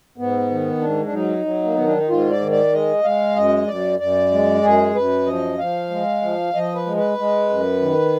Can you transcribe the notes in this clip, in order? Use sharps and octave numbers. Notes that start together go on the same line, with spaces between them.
G#2 B3
D#3
G#2 D4
D4
F#3 D#4
F#3
A#3
D#3 B3
D4
D#4
G#2 F4
D5
D#3
D5
G#3 D#5
G#3 F5
F#2 D#5
F#2 D5
F#2 D5
G#3
F#2 G#4
F#2 B4
F3 D#5
F3 F5
G#3
F3
F3 D#5
B4
G#3
B4
G#3
F#2
D#3